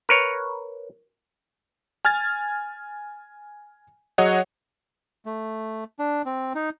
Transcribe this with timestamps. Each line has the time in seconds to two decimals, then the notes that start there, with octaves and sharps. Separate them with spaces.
0.09 A#4 B4 C#5
2.05 G#5 F6 G#6 A6
4.18 F#3 G#4 C#5 D#5 F#5
5.26 A3
5.99 D4
6.25 C4
6.55 D#4